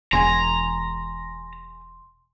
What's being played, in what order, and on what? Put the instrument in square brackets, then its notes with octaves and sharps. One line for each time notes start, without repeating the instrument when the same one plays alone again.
[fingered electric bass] E1 [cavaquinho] G#4 G#5 [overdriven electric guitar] A#5 [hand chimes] C6